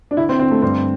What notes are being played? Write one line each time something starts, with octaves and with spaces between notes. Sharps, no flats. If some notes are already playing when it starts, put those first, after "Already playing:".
D4
D3 E4
C4
D3 C4
A3
G2 C4